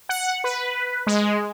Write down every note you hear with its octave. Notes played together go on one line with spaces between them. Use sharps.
F#5
B4
G#3